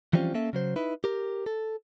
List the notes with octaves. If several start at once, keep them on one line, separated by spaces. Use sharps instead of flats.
E3 F3 G3 C4 C#4 F4
A#3 C#4 A4 E5
C#3 F#3 C5
D#4 E4 B4
G4 A#4
A4